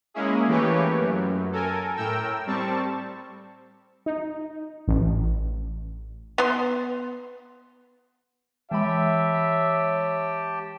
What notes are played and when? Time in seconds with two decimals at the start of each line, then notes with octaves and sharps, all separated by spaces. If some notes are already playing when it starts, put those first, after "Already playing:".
0.14 G#3 A#3 C#4 E4 G#4
0.47 E3 A3 A#3 G4 B4 C#5
0.99 F#2
1.52 A4 A#4 G#5
1.96 A2 A#4 G5 E6
2.46 G3 C4 A5 C#6
4.06 D#4
4.88 A1
6.38 B3 C6
8.71 E3 G#3 G4 C#5 E5 G5 A5 B5